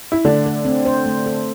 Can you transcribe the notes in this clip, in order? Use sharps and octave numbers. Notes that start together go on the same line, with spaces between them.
E4
D3 A3 D4
A4
C4
C5
A3
A4